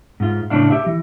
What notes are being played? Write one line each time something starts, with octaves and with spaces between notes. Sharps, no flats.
G#2 F4
A2 C#3 D4 F5
G4 E5
E3